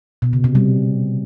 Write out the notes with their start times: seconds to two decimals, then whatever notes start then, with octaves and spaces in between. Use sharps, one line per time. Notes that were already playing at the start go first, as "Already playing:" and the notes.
0.22 B2
0.33 C#3
0.44 C3
0.55 G3